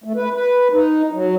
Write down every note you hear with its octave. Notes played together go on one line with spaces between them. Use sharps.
A3
B4
B4
D#4
F#3